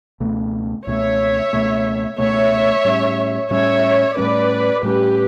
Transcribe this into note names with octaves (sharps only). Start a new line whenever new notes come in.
C#2 B2 A3
C#2 B2 A3 C#5 E5
C#2 B2 A3
C#2 B2 A3 C#5 E5
A2 G3 C#4
A2 G3 C#4 C#5 E5
A2 G3 C#4 B4 D5
A2 G3 C#4 G4 B4